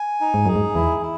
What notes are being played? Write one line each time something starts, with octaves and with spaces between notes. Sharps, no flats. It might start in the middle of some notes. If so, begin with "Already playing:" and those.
Already playing: G#5
D#4
G#2
F#2 G#4
G#2
E2 E4
E4